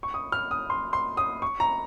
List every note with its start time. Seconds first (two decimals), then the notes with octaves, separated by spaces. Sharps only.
0.03 C#6
0.14 D#6
0.32 F6
0.51 D#6
0.70 C6
0.93 C6
1.17 D#6
1.42 C#6
1.60 A#5